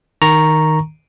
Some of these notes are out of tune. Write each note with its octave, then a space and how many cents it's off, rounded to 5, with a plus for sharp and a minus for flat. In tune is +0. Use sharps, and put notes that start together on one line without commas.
D#3 +0 A#5 +0 C#6 -5